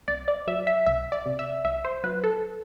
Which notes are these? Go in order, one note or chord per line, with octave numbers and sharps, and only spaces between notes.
C2 D5
D5
F#3 E5
E5
C2 E5
D5
C3
E5
C2 E5
C5
F#3 B4
A4